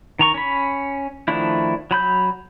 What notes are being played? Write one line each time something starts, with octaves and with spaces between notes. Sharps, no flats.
D#3 A#5 C#6
C#4 B5
D#3 F3 A3 D4 E4
F#3 B5 G6